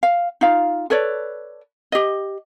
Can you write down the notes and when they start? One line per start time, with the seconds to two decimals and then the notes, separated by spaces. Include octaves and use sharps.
0.03 F5
0.41 D#4 F4 F5
0.90 A4 B4 C#5 D5
1.92 G4 D#5